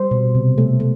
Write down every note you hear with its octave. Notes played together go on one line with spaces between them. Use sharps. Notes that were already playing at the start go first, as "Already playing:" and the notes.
Already playing: G3 C5
B2
C3
A3
A3